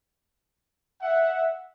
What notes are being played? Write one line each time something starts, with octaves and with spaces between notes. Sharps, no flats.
E5 F#5